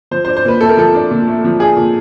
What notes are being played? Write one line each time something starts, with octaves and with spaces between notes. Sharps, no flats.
F3 C5
C5
D4
C5
A#2 B4
A3 A4
A#4
F3 A4
D4
A#2
A3
F3
D4 G#4
A#2